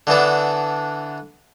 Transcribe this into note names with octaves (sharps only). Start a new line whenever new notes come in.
D3 E3 B3 D4